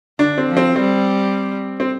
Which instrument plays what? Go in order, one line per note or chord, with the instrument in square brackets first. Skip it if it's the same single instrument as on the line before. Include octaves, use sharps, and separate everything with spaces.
[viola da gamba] D3 [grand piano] D4
[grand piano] C4
[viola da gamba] F3
[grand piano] C4
[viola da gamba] G3 [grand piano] C4
[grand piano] C4